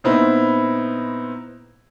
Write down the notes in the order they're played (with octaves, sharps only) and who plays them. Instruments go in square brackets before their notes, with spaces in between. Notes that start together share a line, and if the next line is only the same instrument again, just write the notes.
[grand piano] A#2 B3 C4 D#4 E4